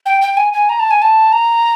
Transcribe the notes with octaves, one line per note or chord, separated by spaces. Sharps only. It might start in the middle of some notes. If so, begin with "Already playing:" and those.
G5
G5
G#5
G#5
A#5
A5
G#5
A5
A#5